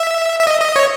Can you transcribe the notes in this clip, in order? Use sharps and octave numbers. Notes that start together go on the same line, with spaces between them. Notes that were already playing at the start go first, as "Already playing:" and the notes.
Already playing: E5
E5
D#5
D#5
C#5